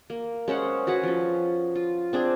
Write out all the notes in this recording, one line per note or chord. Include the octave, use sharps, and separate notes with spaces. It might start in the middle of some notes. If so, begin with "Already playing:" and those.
A#3
G#3 C#4 C5 F#5
F#4 G#4 B4 F#5
F3 C#4
F4
C4 D4 G#4